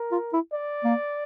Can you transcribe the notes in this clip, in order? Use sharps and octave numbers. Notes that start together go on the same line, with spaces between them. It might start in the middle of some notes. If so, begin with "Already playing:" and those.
Already playing: A#4
F4
E4
D5
A#3